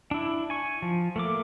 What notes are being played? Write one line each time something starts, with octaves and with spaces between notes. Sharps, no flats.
D4 E4
G#5 C#6
F3
A3 A#3 D6